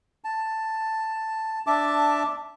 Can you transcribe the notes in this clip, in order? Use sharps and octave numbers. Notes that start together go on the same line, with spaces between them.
A5
D4 E5 A5 D6